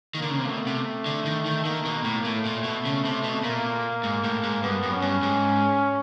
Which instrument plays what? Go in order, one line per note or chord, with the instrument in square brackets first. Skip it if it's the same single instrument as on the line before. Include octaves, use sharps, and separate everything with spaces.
[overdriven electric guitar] D#3 [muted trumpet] A#3
[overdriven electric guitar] D3
C#3
C3
[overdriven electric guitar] B2 [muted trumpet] A3
[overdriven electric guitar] C3
D3
D#3
D#3
[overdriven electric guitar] D#3 [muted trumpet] A#3
[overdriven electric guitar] B2
A2
[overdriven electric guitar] A2 [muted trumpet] A3
[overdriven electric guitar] A#2
B2
C#3
C3
B2
[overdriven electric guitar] A#2 [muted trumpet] A#3
[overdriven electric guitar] G#2
A2
G#2
[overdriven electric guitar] G2 [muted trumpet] B3
[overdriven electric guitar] F#2
[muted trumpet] C#4
[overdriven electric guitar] G2
G#2